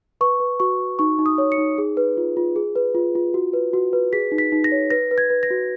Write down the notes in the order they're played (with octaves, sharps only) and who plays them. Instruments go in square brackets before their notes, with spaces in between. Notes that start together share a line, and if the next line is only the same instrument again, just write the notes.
[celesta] B4 C#6
B4
F#4 C#6
F#4
D#4 C#6
D#4
D#6
C#5
C#7
D#4
G#4
B4
F4
F4
G#4
B4
F4
F4
F#4
B4
F#4
B4
G#4 B6
D#4
B6
D#4
A#6
C#5
B4 A#6
B4
G#6
B4
A#6
F#4